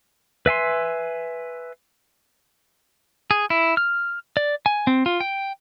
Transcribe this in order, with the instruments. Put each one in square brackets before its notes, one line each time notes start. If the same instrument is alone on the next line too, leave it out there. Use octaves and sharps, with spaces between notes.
[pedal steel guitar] B4 E5 G#5 C6
G#4
E4
F6
D5
G#5
C4
F4
G5